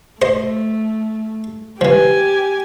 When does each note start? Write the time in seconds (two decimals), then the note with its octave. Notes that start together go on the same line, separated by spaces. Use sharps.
0.22 A3 C5 D#5
1.81 E3 F3 G4 G#5